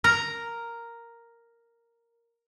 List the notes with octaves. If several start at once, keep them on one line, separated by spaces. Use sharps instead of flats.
A#4 A#5